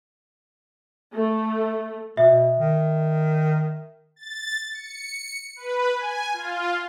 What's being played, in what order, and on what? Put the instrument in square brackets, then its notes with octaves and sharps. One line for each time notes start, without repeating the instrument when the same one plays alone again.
[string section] A3
[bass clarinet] B2 [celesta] E5
[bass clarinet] D#3
[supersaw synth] A6
C#7
B4
G#5
F4